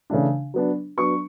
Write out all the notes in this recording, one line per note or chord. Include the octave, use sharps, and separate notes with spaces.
C#3 E3 A3 D4
F#3 B3 D4
F#3 B3 D4 C#6